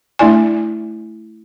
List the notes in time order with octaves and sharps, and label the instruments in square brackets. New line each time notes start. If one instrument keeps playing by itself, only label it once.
[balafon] A3 D4 E4 D5 G#5